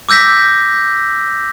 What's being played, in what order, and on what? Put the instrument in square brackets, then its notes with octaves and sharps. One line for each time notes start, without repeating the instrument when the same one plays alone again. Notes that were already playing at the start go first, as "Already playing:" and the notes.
[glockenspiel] D6 E6 G6 A#6 B6